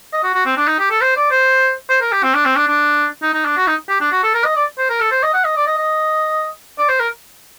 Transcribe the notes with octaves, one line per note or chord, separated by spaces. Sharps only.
D#5
F#4
F#4
C4
D4
D#4
G4
A4
C5
D5
C5
C5
A#4
G4
C4
D4
C4
D4
D4
D#4
D#4
D4
F#4
D#4
G4
D4
F#4
A4
A#4
D#5
D5
C5
A#4
A4
C5
D#5
F#5
D#5
D5
D#5
D#5
D5
C5
A#4